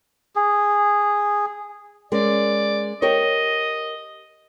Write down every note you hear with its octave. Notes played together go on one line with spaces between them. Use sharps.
G#4
G#3 C#4 A#4 D5
G4 A#4 C#5 D#5